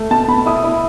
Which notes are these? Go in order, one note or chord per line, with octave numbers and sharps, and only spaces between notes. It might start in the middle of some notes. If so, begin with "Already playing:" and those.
Already playing: A3
B2 A5
B2 B5
E4 D#6
E4